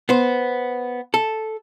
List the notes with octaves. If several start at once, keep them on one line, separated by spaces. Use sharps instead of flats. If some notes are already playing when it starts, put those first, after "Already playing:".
B3 C5
A4